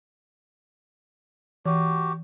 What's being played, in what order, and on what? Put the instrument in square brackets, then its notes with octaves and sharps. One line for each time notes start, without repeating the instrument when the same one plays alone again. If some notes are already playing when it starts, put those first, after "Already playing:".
[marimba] E3 [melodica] F#4 G4